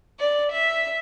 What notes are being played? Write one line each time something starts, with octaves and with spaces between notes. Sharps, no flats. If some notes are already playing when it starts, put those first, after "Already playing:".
D5
E5